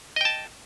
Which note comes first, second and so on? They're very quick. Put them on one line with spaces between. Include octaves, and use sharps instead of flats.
D#5 G5 A5